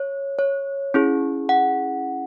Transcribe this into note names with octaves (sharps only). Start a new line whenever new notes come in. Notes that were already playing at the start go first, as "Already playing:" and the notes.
Already playing: C#5
C#5
C#4 E4 G#4
F#5